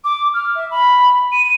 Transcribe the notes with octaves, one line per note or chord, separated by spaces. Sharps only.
D6
F6
E5
B5
D#7